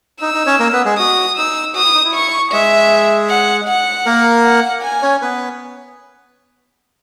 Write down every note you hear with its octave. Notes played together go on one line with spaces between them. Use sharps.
D#4 E6
D#4
C#4 C#5
A#3 A#4
B3 B4
G#3 G#4
F#4 D#6
D#4 E6
F#4 D#6
E4
D#4
E4
C#6
G#3 G#4 E5
F#5
F#5
A#3 A#4
F#5
G#5
C#4 C#5
B3 B4